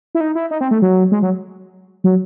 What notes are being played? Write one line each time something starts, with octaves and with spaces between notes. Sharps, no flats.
E4
D#4
E4
D#4
C4
A3
F#3
G#3
F#3
F#3